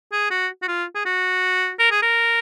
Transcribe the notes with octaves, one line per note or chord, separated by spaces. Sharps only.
G#4
F#4
F#4
F4
G#4
F#4
A#4
G#4
A#4